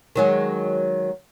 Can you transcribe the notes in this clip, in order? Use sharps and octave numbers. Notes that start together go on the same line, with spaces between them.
D#3 F#3 G#3